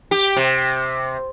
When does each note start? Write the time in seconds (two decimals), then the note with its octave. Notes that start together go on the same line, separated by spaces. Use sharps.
0.11 G4
0.37 C3